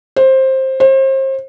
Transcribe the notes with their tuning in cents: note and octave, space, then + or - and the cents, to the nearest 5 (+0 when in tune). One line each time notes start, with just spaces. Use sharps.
C5 +15
C5 +35